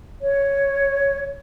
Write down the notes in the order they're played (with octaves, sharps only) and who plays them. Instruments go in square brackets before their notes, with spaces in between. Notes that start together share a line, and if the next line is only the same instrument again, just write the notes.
[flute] C#5